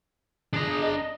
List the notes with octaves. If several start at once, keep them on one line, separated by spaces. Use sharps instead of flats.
D4 G#4 A#5
D#5